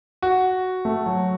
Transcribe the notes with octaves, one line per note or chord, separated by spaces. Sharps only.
F#4
A3
F#3